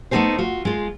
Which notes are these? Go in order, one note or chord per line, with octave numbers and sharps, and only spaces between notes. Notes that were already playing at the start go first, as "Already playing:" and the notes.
A3 B3 C4 D#4 G#4 C5
F4 F#4
G#3 F4